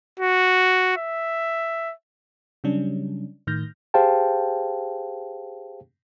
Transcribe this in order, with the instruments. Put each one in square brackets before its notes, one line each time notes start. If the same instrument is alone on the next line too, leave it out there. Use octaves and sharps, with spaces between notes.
[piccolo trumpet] F#4
E5
[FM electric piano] C#3 F#3 G3 C#4 D4
A2 D#3 F6 G6 A#6
[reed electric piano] G4 G#4 C5 F5 G5 A5